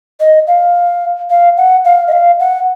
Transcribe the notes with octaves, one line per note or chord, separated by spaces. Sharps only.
D#5
F5
F5
F#5
F5
D#5
F5
F#5